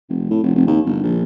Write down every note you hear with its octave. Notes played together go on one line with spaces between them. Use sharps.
F1
A2
F1
F1
D#2
G1
A#1